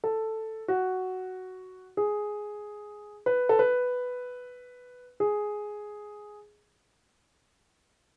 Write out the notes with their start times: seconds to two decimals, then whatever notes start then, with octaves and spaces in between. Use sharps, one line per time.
0.04 A4
0.68 F#4
1.97 G#4
3.26 B4
3.49 A4
3.59 B4
5.20 G#4